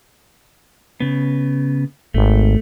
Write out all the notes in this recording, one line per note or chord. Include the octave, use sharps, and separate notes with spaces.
C#3 B3
G#1 A3